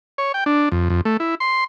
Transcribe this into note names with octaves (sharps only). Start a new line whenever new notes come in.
C#5
G5
D4
F2
F2
A3
E4
C6